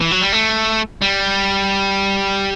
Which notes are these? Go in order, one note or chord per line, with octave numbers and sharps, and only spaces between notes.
E3
F#3
G3
A3
G3